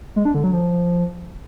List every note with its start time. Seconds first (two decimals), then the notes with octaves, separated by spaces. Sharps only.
0.16 G#3
0.25 D4
0.34 D3
0.44 F#3
0.53 F3